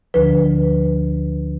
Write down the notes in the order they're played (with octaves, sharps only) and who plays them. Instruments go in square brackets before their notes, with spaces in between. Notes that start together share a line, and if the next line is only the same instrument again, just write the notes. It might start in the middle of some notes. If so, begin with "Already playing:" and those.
[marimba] D2 D3 F3 B4